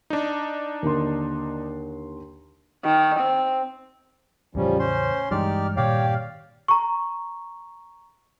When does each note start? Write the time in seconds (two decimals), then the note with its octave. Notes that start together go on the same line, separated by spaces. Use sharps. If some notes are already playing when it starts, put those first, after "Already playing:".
0.10 D4 D#4
0.83 D#2 D3 C6
2.84 D#3
3.20 C4
4.55 E2 A2 C#3 F3 G3 C#4
4.79 C#4 C5 C6
5.31 G2 E3 G#3 D#4 G4 D5 F6
5.77 G2 A#2 D#3 G4 C#5 D5 F5 G5
6.68 A#5 C#6